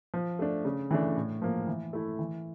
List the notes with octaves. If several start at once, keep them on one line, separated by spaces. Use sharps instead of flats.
F3
A3 D4
C#3
E3 A3 D4
A2
F3 A#3
E3
A3 E4
E3